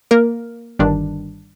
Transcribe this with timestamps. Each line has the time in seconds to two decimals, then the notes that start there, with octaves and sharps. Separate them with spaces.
0.11 A#3 A#4
0.79 G1 G2 D#3 G3 D4